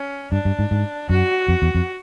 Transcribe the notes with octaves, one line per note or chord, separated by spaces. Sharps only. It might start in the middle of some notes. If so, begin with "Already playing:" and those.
Already playing: C#4
G2 D4
G2
G#2
G#2
F#2 F#4
F2
E2
F2